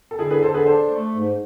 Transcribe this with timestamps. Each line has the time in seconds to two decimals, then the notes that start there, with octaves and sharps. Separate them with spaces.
0.11 A4
0.19 D3 E4 G#4
0.30 G#4 B4
0.42 D3 A4 C5
0.54 G#4 B4
0.66 D4 A4 C5
0.90 A3
1.13 G#2